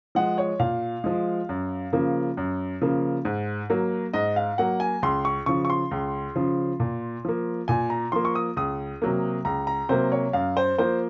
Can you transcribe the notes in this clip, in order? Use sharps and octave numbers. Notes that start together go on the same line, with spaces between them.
F3 G#3 F#5
C#5
A#2 F5
F3 G#3
F#2
C#3 F3 A#3
F#2
C#3 F3 A#3
G#2
F#3 A#3
G#2 D#5
F5
F#3 A#3 F#5
G#5
C#2 C6
C#6
C#3 F3 C#6
C#6
C6
C#2
C#3 F3
A#2
F3 A#3
A#2 G#5
A#5
F3 A#3 C6
C#6
D#6
C#2 D#6
C3 F#3 A#3
C#2 A#5
A#5
C3 F#3 A#3 C5
C#5
F#2 F5
C5
F3 A#3 C5